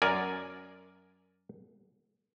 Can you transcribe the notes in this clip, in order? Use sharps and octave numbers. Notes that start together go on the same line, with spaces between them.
F#2 A#4 D5 G#5